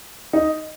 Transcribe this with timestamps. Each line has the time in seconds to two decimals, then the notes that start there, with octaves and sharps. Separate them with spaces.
0.33 D#4